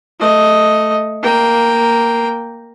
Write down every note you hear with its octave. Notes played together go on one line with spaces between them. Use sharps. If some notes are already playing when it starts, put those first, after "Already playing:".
A3 D#5
A#3 G5